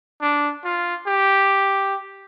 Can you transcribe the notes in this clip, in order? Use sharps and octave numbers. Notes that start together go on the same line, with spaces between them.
D4
F4
G4